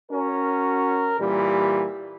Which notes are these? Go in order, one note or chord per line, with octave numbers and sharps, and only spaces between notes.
C#4 F#4 A#4
A#2 E3 G3